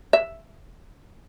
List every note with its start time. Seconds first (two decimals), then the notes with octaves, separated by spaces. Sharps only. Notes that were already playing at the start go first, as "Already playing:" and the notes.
0.13 E5